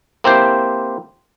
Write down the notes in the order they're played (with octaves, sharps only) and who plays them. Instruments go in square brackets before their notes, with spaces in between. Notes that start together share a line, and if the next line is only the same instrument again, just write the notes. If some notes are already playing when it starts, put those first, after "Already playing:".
[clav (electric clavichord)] A#3 C4 E4 G4 C5